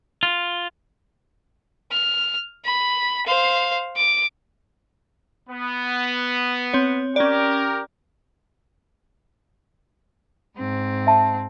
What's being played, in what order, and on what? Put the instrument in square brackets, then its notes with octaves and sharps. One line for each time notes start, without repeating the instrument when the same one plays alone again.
[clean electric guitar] F4
[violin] F6
B5
C5 F5
D6
[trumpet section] B3
[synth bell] C4 C#5
[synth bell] C#4 D5 [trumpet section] G4 A#4
[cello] G#2 C4
[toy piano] E5 A5